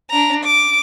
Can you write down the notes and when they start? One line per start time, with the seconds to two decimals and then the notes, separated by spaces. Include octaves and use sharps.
0.10 D4 A#5
0.44 D6